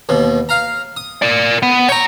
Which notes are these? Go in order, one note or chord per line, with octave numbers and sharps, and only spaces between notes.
D#2 B2
F5 A#5
D#6
A#4 D5
B3
C#5 G5 A#5 C#6